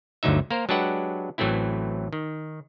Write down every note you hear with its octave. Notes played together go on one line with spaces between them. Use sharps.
G1 D2 D3 F#3 D#4 E5
A#3 A#4 C5
F#3 G#3 D4 G4 B4 F#5
A1 E3 F#3 A3 C4 E4
D#3